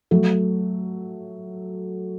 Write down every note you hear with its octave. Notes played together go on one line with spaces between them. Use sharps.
F#3 A3